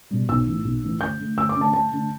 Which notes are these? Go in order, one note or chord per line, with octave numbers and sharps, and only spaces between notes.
B2 G3
B1 E6
A2 E3
B1
A2 E3
D2 G6
D3 A3
D2 E6
D6
D3 A3
A5
D2 A5
D3 A3